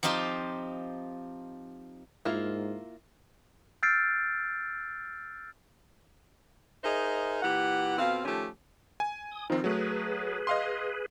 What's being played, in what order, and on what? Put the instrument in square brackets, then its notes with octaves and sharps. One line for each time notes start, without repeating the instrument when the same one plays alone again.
[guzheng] F3 C4 D#4 F4 G4 C5
[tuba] G#2 [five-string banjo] A#3 E4 F4
[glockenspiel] E6 F6 G6 A6 C7 D7
[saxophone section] D#4 G#4 A#4 C5 D#5 E5
A#2 E3 G4 F#5
F2 B2 C4 F5
D#3 F3 A3 C#4 G4
[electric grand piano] G#5
[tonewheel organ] D#6
[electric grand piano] D#3 C4 [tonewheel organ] F3 D#4 F4
[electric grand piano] F#3 A3 [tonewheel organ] G#4 B4
[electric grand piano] D#5 F5 C6